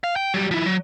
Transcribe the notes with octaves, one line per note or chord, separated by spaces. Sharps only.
F5
G5
F#3 G3
F3 E4
F#3